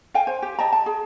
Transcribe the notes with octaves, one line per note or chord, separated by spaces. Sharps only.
F5 G5 G#5
C5
G4
D#5 G5 A5 A#5
A5
G#4